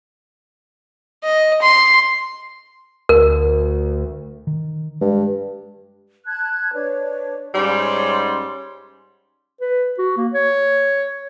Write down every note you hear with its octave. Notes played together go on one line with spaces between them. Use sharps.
D#5
C6
D2 A#4
D#3
G2 G#3
A5 F#6 G#6
D4 B4 C#5
G#2 G3 C#4 C#5 C6
B4
F#4
A#3
C#5